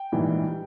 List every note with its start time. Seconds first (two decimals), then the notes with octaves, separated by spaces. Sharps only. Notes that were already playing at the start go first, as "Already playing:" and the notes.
Already playing: G5
0.12 A#1 G#2 E3 G3